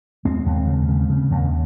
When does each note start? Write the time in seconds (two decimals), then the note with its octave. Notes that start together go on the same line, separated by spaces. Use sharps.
0.25 D#2 G#3 C4
0.46 D#2
0.67 C#3
0.89 C#3
1.10 C#3
1.31 D#2